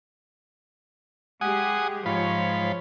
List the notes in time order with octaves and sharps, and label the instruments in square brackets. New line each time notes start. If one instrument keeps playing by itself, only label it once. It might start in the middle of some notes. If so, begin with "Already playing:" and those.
[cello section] G#3 G4 G#4 [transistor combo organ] F#5 G#5 D#6
[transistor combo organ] G#2 F4 B5 [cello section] F3 C#5